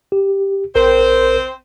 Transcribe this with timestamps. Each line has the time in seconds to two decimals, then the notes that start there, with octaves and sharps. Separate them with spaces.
0.12 G4
0.76 A#1 C4 A#4 C5